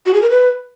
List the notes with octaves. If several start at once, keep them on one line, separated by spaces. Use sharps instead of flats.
F#4
G#4
A#4
B4